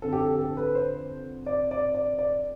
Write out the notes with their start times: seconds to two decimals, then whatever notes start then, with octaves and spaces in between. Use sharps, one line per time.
0.02 F2 D3 A4
0.13 G4
0.20 A4
0.39 A4
0.57 B4
0.75 C5
1.46 D5
1.71 D5
1.94 D5
2.18 D5